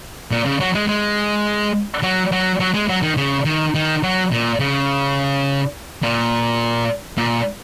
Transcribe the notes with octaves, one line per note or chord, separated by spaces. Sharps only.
A#2
C#3
F#3
G#3
G#3
F#3
F#3
F#3
G#3
F#3
D#3
C#3
D#3
D#3
F#3
A#2
C#3
A#2
A#2